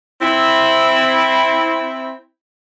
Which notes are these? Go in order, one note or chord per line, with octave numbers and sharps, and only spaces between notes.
C4 E4